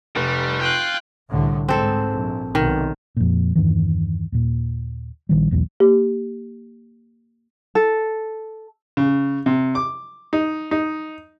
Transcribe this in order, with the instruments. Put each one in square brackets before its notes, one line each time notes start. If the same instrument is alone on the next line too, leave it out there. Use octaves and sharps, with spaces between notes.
[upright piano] F1 [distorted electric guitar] G3
[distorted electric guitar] F4 [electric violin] G5 F#6
[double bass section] C2 A2 D3
[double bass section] G#2 [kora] C4 A4
[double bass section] A#1
[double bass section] B1 C3 [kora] D#3
[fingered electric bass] F2 A#2
E2 G2 D#3 E3
D#2 A#2
A#1 D#3 G3
B1 E2 B2 F#3
[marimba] A#3 G4
[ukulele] A4
[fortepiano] C#3
C3
D6
D#4
D#4